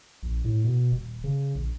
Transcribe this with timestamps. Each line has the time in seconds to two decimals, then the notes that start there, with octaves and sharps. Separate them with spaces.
0.23 A#1
0.44 A2
0.64 B2
0.92 D#1
1.24 C#3
1.55 A#1